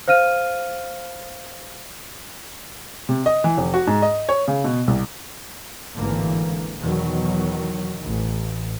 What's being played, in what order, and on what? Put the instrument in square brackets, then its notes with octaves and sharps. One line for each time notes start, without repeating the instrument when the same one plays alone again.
[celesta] C5 F5 F6 D#7
[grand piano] C3
D#5
E3
F1
F#4
G#2
D#5
C#5
C#3
B2
C2
[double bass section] G#1 A2 D3 E3 A#3
E2 B2 D#3 F#3
A1